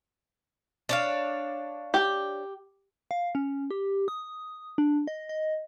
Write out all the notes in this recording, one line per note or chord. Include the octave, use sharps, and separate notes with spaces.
D4 C#5 F5
G4
F5
C#4
G4
D#6
D4
D#5
D#5